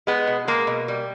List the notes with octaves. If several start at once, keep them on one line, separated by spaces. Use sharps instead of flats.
G#3 B3
B2
G#3 A#3
B2
G3